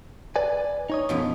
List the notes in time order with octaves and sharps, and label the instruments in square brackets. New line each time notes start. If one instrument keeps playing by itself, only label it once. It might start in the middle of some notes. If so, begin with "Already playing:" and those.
[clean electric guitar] B4 D5 G#5
D#4 C#5 D#5
[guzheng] F#2 B2 F3